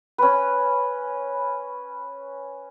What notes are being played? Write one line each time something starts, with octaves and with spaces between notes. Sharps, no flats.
C#4 B4